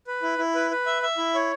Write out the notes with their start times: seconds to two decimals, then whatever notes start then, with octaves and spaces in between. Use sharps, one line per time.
0.07 B4
0.23 E4
0.38 E4
0.55 B4
0.71 B4
0.86 E5
1.02 E5
1.18 E4
1.34 C#5